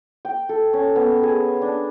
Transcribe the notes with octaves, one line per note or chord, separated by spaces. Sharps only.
G5
A4
C#4
B3
G#4
D4